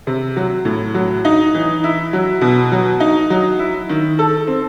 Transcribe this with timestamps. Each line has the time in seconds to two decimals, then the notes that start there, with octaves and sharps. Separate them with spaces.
0.07 C3
0.36 F#3
0.65 A2
0.94 F#3
1.25 D#4
1.54 E3
1.84 E4
2.13 F#3
2.41 B2
2.72 F#3
3.00 D#4
3.30 F#3
3.59 E4
3.89 D#3
4.19 A4
4.47 C4